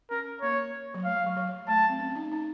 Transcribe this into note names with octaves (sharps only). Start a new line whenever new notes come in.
C#4 A#4
A#3 C#5
F#3
A3 F5
F#3
F#3
F#3
A3 A5
A3
C4
C#4
D#4
D#4